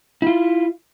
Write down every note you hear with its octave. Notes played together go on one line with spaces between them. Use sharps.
E4 F4